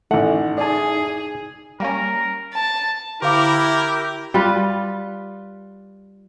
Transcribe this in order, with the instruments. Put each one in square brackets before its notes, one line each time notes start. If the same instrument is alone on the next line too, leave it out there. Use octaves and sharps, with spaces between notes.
[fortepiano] A1 F#5 [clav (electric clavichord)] A3 [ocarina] D#4
[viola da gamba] G#4 [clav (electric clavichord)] D5 A5
[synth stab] G3 A#3 C#4 [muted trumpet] A#4
[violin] A5
[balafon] D3 F5 D6 [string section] E4 [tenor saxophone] G4 [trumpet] A#4
[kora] G3 F4 B4